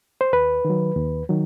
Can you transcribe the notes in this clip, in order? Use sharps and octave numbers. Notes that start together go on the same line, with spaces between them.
C5
D#2 B4
D#3
F#3
D#2
D#3 F#3